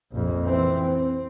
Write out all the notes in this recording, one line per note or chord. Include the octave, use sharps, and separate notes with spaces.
A#1 F2
E3 C4
C4